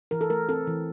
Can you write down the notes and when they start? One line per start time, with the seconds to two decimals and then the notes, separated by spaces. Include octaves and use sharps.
0.11 E3 A#4
0.21 A4
0.30 A3 A#4
0.49 C4 A4
0.67 E3